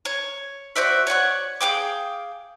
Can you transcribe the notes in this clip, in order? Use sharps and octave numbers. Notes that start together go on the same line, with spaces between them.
C#5
F#4 C5 D5 E5
C#5 D5 F#5 C#6
G#4 F5 G5 D6